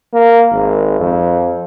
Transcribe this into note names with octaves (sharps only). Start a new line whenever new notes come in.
A#3
G#1
F2